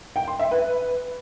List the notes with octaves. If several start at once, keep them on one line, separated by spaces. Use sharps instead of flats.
G5
C6
E5
B4